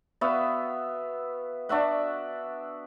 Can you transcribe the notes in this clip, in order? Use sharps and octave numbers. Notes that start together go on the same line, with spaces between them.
B3 F#4 E5 F5
D4 F#4 E5 F#5